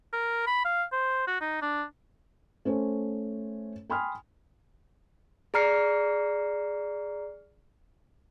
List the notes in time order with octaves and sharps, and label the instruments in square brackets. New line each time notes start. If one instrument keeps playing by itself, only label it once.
[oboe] A#4
B5
F5
C5
F#4
D#4
D4
[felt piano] A3 C#4 C5
G5 G#5 B5 C6 D#6 F6
[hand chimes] G#4 D5 A#5 F6 C7 C#7